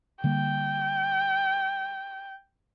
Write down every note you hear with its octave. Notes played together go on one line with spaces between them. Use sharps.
D3 G3 A#3 G5